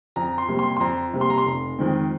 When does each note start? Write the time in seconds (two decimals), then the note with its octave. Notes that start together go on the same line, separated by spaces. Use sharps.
0.16 F2 A#5
0.38 C6
0.49 C3 G3 A#3
0.59 C6
0.77 C6
0.80 F2 A#5
1.13 C3 G3 A#3
1.21 C6
1.30 A#5
1.38 C6
1.45 F1
1.79 F2 D#3 G#3 C4